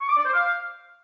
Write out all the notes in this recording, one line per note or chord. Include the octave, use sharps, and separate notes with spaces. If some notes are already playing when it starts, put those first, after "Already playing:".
C#6
D6
D5
C5
F5